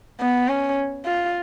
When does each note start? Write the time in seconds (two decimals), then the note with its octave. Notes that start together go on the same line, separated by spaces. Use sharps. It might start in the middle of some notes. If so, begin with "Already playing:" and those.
0.21 B3
0.49 C#4
1.06 F4